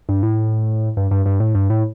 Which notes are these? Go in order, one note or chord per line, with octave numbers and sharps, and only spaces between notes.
G2
A2
G2
G2
G2
A2
G2
A2